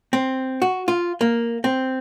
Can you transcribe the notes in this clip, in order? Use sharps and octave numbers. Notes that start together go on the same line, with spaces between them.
C4
F#4
F4
A#3
C4